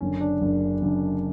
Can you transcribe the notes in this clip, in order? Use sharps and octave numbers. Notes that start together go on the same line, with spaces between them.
F#1 F#2 D3 C#4
D4
F#1 F#2 D3
F#1 F#2 D3